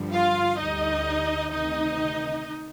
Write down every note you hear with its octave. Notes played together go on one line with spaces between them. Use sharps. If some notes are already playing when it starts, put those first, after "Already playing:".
Already playing: G2 D3 F3
F4 F5
D2 D3 G3 D#4 D#5
D2 C3 D#3 D#4 D#5